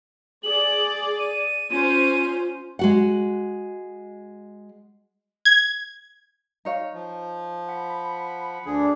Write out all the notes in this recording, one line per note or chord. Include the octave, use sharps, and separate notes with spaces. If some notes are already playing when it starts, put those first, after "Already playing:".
G#4 D5 F#7
D#7
C#4 F4 C5 D#7
G#3 F#4 F#5
G#6
D#4 C#5 F5
F3
F#5 B5
D2 D3 D4 G#4